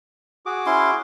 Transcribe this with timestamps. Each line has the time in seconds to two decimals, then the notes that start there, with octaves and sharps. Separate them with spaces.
0.46 F#4 G#4 D6
0.66 C#4 E4 C6